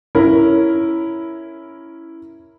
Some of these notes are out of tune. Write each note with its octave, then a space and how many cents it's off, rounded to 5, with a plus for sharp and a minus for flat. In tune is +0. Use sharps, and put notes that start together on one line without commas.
C#4 +0 E4 +0 A#4 +0